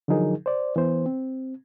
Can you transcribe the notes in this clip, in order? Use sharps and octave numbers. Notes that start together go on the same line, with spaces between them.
D3 F3 F#3 D#4 G#4 A#4
C5 D5
E3 B3 C5
C4